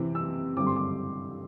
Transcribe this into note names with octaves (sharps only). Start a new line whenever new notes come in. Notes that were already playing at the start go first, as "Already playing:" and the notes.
Already playing: C3 E3 C4
E6
G2 D3 C4 D6
C6
D6